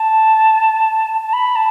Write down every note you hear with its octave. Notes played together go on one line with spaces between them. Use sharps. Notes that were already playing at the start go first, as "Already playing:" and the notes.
Already playing: A5
A5
B5
A5